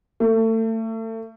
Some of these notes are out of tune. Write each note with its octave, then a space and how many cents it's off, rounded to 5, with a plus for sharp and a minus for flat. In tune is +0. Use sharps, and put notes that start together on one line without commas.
A3 +30